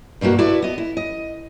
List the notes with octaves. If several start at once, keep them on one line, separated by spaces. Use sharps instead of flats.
G2 B2 A3 A#3 F#4
E4 F#4 A4 B4 D5 E5
B3 D#5
E4
D#5